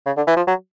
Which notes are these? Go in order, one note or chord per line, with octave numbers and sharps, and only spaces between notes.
C#3
D3
E3
F3
F#3